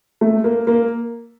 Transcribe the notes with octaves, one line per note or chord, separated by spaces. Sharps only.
A3
A#3
A#3